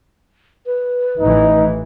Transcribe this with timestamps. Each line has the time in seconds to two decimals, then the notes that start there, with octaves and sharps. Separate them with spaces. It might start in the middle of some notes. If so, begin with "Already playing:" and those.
0.66 B4
1.19 A1 A2 E3 D#4